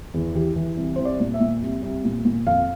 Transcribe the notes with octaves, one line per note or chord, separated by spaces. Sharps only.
E2
E3 G4
E3
C2
C2 C5
D5
A#2
E5
A#2
C2
C2
A#2
A#2
F2 F5